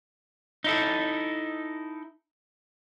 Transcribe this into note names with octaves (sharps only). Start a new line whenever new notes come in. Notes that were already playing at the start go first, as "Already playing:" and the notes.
D#4 E4 A4